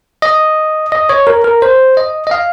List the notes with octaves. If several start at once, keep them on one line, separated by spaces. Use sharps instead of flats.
D#5
D#5
C#5
A#4
A#4
C5
D#5
D#5
F5